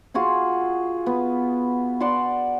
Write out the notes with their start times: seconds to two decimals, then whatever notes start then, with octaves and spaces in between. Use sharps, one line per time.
0.14 F4 F#4 G#4 F5
1.06 B3
2.00 D5 F#5 A5 C6